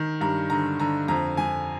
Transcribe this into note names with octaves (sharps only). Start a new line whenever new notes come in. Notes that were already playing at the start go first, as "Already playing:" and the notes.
Already playing: D#3
G2 A#5
D3 A#5
D3 A#5
F2 A#5
F2 G#5